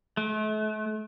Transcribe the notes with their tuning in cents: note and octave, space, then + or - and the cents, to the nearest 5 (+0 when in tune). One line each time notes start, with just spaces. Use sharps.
A3 -40